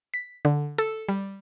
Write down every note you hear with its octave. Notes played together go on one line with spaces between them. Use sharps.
B6
D3
A4
G3